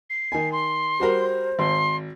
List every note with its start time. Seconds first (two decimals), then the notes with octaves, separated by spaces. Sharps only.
0.10 C7
0.32 D#3 G#5
0.52 C6
1.00 G3 F#4 A#4 C5
1.59 G#1 C6